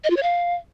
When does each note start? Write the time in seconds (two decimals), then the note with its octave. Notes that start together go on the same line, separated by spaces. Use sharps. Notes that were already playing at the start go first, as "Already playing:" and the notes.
0.04 D#5
0.10 F4
0.16 C#5
0.23 F5